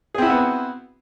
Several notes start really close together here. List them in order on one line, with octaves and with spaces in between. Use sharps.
G#4 C4 E4 F#4 B3